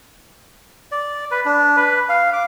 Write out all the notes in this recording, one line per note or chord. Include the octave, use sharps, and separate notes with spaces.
D5
B4
D4
B4
F5
D6